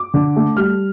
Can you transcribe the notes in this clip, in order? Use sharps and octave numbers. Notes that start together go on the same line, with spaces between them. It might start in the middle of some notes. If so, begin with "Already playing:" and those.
Already playing: D6
D3
A3
G3 F6